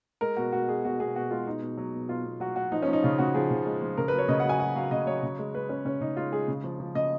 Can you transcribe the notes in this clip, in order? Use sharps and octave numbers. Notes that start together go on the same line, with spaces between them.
G#3 A#4
B2 F#4
B2 F#4
G#3 G#4
B2 F#4
B2 G#4
B2 F#4
G#3 F4
B2 D#4
B2
F#3
B2
B2 F4
B2
F#3 F#4
F#3 F#4
F3 D#4
C#4
F3
D#4
C#3 F4
C#3 F#4
F3 G#4
C#3
G#3
F3
C#3 A#4
F#3 B4
C#5
C#3 D#5
F#5
F#3 G#5
F#3 F#5
F#3 F5
C#3 D#5
F#3 C#5
C#3
G#3
G#3 B4
G#3 C#4
C#3 C#4
C#3 D#4
G#3 F4
G#3 G#4
C#3
F3
F3
C#3 D#5